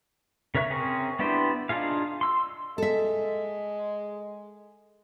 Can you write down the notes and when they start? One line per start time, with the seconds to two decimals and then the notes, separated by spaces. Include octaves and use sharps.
0.55 C#3 A#4 C#5 E5 F#6
0.70 C4 C#4 G#4 A#4
1.19 B3 D4 E4 G4 C5
1.69 D4 D#4 F4 G#4 F5
2.21 C6 E6
2.78 G#3 A4 E5